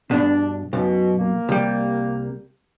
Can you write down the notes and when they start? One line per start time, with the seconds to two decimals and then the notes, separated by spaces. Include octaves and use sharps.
0.11 G2 B2 D4
0.73 B1 F#2 B2
1.19 A#3
1.49 C2 G3